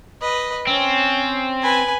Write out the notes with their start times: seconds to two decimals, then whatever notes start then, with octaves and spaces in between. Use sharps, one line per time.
0.22 B4 D#5
0.67 C4 C#4
1.63 B4 G#5